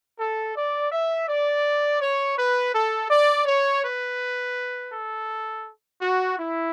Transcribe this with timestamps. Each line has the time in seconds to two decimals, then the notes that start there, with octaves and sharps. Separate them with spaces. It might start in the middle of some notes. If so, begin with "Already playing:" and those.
0.18 A4
0.55 D5
0.92 E5
1.27 D5
2.00 C#5
2.37 B4
2.73 A4
3.09 D5
3.45 C#5
3.83 B4
4.91 A4
6.00 F#4
6.37 E4